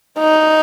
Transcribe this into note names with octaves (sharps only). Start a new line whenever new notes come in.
D#4